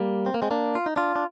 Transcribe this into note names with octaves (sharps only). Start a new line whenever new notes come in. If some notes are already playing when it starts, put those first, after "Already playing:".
Already playing: G3 A#3
C4
A#3
G#3 C4
A#3 D4
F4
D#4
D4 F4
D4